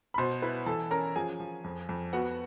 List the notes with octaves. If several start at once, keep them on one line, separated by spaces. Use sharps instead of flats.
B5
B2 C5 C6
E4 B4 B5
E3 A4 A5
C#4 A#4 A#5
F3 G#4 G#5
F3
F2
F2
B3 F#4 F#5